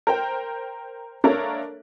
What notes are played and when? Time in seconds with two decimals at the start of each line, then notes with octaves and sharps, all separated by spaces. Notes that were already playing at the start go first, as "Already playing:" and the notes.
0.07 A#4 C5 G5
1.24 A#3 D4 A4 A#4 C#5 E5